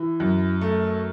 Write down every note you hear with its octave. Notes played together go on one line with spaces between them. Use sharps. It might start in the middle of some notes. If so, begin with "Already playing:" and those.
Already playing: E3 E4
F#2
A3